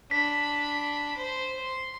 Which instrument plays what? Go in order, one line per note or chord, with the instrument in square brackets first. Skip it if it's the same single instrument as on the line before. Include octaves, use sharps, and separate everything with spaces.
[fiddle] D4 B5 [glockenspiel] B6
[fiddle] C5
C6